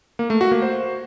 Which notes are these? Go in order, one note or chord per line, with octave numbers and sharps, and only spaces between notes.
A#3
A3
F#4
A#3
C5